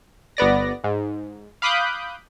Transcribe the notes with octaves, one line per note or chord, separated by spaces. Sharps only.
G1 B3 D5 A#6
G#2
F5 B5 D6 D#6 F#6 G6